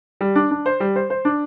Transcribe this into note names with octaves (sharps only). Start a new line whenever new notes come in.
G3
D4
D4
C5
G3
C5
C5
D4